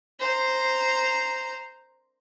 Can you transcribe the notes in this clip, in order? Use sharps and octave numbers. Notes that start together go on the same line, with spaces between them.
C5 A#5